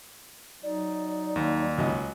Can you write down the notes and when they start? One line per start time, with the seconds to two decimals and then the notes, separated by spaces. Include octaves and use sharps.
0.63 F#3 D#4 D5
1.36 D#2
1.78 C#2 F#3 D#5